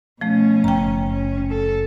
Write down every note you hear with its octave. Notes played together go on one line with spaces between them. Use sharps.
B2 F3 A3 C#4
F#1 G5 A#5
C#4
A4